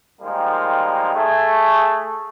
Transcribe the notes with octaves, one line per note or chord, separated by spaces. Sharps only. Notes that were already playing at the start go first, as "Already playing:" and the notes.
D#3 F3 G3 G#3 A#3 D#4
A3 G#4